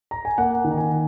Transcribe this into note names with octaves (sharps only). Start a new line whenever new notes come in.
A#5
G#5
A#3 F#5
D#3
A#5
G#5